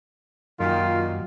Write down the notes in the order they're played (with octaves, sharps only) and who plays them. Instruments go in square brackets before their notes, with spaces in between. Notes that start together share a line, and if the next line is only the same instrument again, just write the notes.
[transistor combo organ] F#2 [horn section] A#2 D#3 [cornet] F4